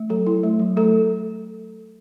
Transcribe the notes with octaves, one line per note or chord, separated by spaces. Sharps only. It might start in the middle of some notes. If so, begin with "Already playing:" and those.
Already playing: A3
F#3 A4
E4
A3
F#3
A3 A4